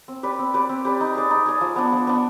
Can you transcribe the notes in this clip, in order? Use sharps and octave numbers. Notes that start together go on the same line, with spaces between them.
C4
G4 B4 D5
C4
G4 B4 D5
C4
G4 B4 D5
D#4
G#4 D5
D#4
G#4 D5
F3
B3 D4
F3
B3 D4